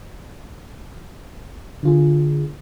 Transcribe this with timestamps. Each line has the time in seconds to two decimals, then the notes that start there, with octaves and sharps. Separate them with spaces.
1.83 D3 F4 G#4